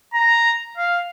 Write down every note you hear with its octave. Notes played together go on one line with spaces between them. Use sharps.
A#5
F5